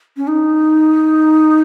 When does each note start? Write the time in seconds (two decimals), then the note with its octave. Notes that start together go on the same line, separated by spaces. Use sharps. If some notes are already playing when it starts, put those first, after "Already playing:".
0.17 C#4
0.28 D#4